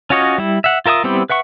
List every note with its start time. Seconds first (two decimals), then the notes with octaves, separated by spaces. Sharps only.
0.10 C#4 F4 F#4 C#5 D#5
0.38 G3 E4
0.64 E5 F#5
0.86 F4 A#4 E5 G5 D#6
1.04 G3 B3 C4 E4 G4
1.30 B4 E5 F#5 C#6